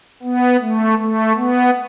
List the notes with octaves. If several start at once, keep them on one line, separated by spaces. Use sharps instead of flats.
B3
A3
A3
B3